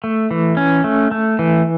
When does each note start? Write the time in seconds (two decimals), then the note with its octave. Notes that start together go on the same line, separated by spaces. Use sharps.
0.04 A3
0.31 E3
0.57 C#4
0.84 A3
1.11 A3
1.39 E3